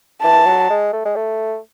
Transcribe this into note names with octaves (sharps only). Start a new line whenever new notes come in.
E3 A5
F#3
G#3
A3
G#3
A3